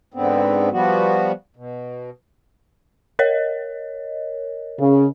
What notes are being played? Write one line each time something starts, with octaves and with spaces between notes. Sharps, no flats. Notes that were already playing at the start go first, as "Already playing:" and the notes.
G#2 D3 B3 C4
F3 G3 B3 F#4
B2
A#4 C#5 D#5
C#3